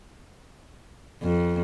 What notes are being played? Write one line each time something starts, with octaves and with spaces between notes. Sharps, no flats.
F2